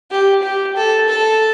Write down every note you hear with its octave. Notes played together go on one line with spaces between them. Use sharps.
G4
G4
A4
A4